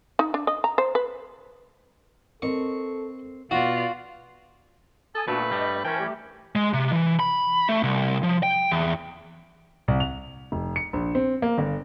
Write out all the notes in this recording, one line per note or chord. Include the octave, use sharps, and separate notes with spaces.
D#4
D4
D#5
A#5
C5
B4
C4 A4 A#4 D#5 C#6
B2 F4 F#4 D5
A4 G#5 D#6
A#2 A3 B3 D4 F#4 B4
G2 G3 A3 D#5
E3 C#4 A#4 C5 G5 A5
G3 A3 G4
G#3
C3
E3
B5
A3
C2
F3
G5
E2
C2
F7
F1
C#7
A#1
C4
A#3
G1